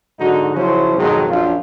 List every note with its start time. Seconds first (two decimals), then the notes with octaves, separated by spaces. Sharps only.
0.19 G#2 D3 F#3 D#4 F#4
0.55 C#3 F3 F#3 C#4 E4 C5
0.97 G#1 F2 B2 D#3 F#3 G#3
1.29 A#1 F#2 D4 F4